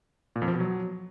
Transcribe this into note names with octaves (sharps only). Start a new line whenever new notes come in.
A#2
F2
F3
B2
F#3